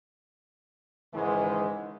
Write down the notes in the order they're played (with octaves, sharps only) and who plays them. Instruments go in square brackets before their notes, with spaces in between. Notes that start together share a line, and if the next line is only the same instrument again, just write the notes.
[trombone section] C#2 G#2 D#3 E3 G#3